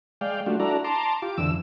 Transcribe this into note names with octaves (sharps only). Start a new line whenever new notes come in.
G#3 D5 F5 G5
G3 A3 D4 F4 F#4
D4 E4 F#4 A4 D5 A#5
A5 A#5 C6 D6
F4 G4 D6
F2 D3 E3 E6